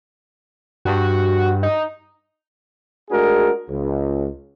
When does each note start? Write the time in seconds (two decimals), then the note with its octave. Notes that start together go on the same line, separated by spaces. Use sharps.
0.85 G2 F#4
1.63 D#4
3.10 G#3 A3 D4 F#4 G#4 A#4
3.69 C#2